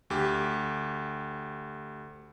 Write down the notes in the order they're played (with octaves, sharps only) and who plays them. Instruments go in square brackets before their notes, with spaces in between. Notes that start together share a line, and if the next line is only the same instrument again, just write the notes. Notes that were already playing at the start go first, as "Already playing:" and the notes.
[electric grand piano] D2 G4